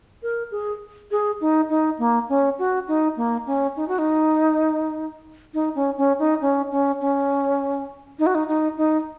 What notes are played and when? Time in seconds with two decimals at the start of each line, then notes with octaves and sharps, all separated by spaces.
0.23 A#4
0.51 G#4
1.11 G#4
1.41 D#4
1.69 D#4
1.99 A#3
2.29 C#4
2.59 F#4
2.88 D#4
3.17 A#3
3.47 C#4
3.76 D#4
3.88 F#4
3.99 D#4
5.54 D#4
5.75 C#4
5.97 C#4
6.19 D#4
6.41 C#4
6.71 C#4
7.01 C#4
8.19 D#4
8.26 F#4
8.35 D#4
8.48 D#4
8.77 D#4